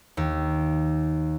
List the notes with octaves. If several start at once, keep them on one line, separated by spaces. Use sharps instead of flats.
D#2